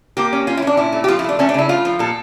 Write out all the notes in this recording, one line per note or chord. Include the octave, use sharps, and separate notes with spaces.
A#3 G4
C#4
C#4 F4
E4
C#4 D4
A#2 E4
A3
G4
F3 F4
E4
A3 D4
A3 C#4
D4
C#3 E4
A3 F4
F3
A#2 A4